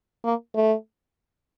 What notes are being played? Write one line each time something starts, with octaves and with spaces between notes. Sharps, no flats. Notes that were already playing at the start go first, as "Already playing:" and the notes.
A#3
A3